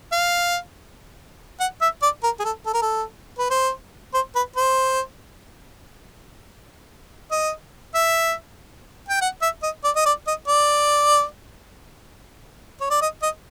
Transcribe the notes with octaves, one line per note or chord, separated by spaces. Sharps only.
F5
F#5
E5
D5
A#4
G#4
A4
A4
A#4
A4
B4
C5
C5
B4
C5
D#5
E5
G5
F#5
E5
D#5
D5
D#5
D5
D#5
D5
C#5
D5
D#5
D#5